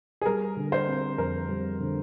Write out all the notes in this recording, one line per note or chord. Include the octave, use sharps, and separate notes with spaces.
G#4
G3 A#4
D3
C5
C4
F2 A#4
G3
D3